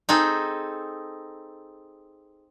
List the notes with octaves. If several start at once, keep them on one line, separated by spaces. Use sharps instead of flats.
C4 D#4 G#4 A4